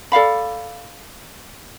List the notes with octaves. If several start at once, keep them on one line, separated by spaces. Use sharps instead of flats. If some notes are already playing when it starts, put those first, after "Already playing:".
A4 D5 F5 B5